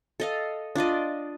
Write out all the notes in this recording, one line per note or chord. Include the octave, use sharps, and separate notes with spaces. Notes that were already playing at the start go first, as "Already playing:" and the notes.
A4 D#5 F5
D4 F4 D5 D#5